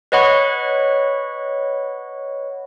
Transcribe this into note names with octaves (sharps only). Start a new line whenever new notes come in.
B4 C#5 D#5 F#5 B5 C#6